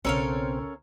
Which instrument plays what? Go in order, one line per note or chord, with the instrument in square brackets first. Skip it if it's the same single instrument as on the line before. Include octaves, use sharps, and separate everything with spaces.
[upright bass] B1 C#3 [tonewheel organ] C4 [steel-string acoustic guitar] C#4 A#4 [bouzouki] A4 C#5 F5